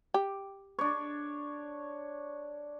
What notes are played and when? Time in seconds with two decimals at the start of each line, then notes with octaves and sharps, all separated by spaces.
0.14 G4
0.79 D4 C#5